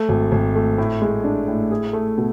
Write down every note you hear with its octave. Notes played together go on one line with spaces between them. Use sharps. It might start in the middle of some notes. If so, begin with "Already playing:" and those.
Already playing: A3
G#1
G#1
A3
A2
G#3
D4
A2
G#4
A3
B2